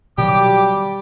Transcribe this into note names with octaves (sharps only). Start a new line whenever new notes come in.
B2 D#3 F#3 G3 G4 D6